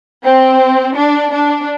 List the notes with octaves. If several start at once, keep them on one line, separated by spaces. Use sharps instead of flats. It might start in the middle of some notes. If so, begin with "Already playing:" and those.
C4
D4
D4